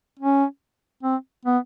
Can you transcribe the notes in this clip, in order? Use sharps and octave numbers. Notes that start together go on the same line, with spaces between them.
C#4
C4
B3